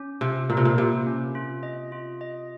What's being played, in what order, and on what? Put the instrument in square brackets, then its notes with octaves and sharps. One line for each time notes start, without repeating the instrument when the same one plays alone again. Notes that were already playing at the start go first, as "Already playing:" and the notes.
Already playing: [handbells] C#4
[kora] C3 [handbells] F4
[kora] A#2 [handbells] A#3
[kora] C3
A#2
[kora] C3 [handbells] A#3
[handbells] C#4
F4
D#5
F4
D#5